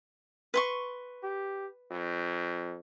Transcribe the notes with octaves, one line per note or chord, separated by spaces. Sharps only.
B4 C6 C#6
G4
F2